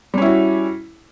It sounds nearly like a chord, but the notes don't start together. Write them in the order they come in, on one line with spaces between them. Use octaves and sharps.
G3 C#4 E4 F#4